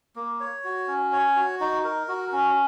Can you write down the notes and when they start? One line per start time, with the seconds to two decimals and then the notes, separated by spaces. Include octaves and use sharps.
0.16 A#3
0.40 C#5
0.65 F#4
0.88 C#4
1.13 C#5
1.36 F#4
1.61 D#4
1.84 A#4
2.08 F#4
2.32 C#4